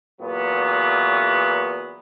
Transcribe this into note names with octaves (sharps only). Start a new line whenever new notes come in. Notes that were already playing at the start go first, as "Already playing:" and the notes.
E2 A#2 F#3 B3